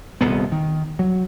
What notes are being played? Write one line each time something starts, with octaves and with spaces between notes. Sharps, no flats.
D#1 C2 B3
D#3
F#3